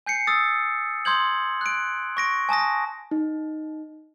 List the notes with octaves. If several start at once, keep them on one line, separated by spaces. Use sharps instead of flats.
G#5 G6 C7 C#7
D#6 E6 A6
C6 D#6 G6 G#6 F#7
F#6 D7
C#6 A#6 D7
G#5 A5 D#6 A#6
D#4